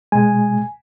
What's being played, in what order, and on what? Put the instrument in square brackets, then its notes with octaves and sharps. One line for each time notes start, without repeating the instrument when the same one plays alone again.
[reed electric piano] B2 G#3 [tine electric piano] G#5